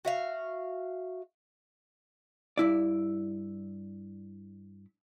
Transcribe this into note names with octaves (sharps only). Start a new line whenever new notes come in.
F#4 E5 F5
G2 E4 D5